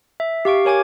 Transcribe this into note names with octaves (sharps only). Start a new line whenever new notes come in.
E5
G4 F5 C#6 D7
A#4 C#5 G#5 D6 G#6